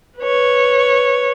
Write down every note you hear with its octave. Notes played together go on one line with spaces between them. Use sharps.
B4 C#5